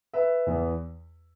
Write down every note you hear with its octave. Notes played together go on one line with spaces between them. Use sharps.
B4 E5
E2 E3 B3